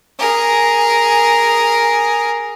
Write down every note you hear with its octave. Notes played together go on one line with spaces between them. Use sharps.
G#4 A#4